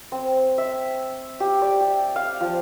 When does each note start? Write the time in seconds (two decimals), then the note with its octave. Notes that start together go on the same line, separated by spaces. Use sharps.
0.12 C4
0.58 E5
1.40 G4
1.62 D5
1.80 G4
2.16 F5
2.40 F3